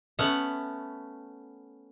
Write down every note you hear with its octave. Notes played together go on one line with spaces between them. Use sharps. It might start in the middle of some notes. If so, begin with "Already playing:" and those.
A3 B3 C#4 F#5